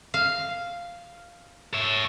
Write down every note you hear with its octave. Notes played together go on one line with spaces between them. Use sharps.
F5
C#5 E5